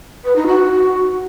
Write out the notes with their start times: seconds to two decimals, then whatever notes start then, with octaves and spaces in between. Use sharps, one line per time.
0.25 B4
0.36 D#4
0.47 F#4